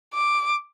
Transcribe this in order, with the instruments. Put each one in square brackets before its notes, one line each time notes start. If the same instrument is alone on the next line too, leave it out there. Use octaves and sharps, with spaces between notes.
[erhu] D6